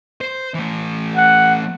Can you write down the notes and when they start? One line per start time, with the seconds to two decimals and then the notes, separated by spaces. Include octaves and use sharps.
0.21 C5
0.54 E3 A3
1.16 F#5